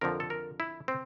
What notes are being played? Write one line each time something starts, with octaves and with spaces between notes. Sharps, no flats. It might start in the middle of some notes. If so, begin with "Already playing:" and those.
F2 D3 F3 A#4
A4
A#4
E4
C4